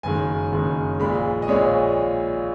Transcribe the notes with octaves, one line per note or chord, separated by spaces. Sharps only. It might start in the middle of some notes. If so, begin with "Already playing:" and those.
F#1 F#2 D#3 G#3 G#5
F#1 F#2 D#3 G#3
A#1 A#2 G#3 B5
D#5
A#1 A#2 G#3 C#5